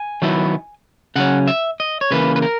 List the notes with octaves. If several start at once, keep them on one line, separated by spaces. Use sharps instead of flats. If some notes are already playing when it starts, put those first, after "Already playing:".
Already playing: G#5
D#3 F#3 B3 E4
C#3 F#3 C#4 F#5
E5
D#5
C#5
C#3 E3 A#3 B4
B4
A#4